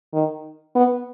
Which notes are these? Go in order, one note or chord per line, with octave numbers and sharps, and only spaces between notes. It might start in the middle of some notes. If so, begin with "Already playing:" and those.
D#3
B3